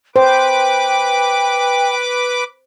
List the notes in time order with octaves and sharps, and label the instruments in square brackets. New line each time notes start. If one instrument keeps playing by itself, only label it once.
[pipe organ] B4 D6 [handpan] C5 [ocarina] G5